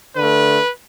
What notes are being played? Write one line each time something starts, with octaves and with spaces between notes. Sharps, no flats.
D3 A3 B4